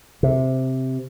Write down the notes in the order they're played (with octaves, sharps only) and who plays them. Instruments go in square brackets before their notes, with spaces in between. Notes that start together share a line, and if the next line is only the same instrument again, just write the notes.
[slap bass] C3